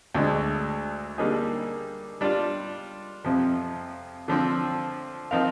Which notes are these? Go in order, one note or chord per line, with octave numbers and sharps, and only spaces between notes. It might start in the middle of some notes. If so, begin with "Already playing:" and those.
D2 D3 G#3
D3 G3 A#3 D#4 G#4
G3 D4 F4
F2 C3 F3
D3 F3 C4
F3 C4 D#4 A#4 F5